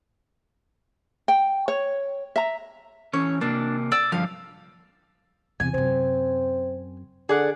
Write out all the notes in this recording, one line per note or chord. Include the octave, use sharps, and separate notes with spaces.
G5
C#5
E5 A#5
E3 C#4 C#5
C3 A#3 D4
D5 E6
G2 D3 F3 F5
E2 C3 G#5
F#2 C3 C4
D3 G#4 D5 F#5